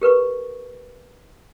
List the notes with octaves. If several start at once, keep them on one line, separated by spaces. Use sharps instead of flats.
G4 A#4 B4 C#6